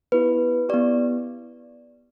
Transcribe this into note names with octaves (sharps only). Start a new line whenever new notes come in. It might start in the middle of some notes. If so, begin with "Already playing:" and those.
B3 E4 G4 B4
B3 E4 G4 D5